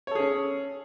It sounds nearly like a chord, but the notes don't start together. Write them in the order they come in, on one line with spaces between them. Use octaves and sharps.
C#5 A4 G#4 C#4